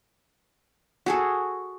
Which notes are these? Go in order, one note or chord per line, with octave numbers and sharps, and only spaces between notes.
F#4 G#4 A4